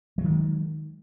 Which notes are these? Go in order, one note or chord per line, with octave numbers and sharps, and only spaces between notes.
D#3 F#3 G#3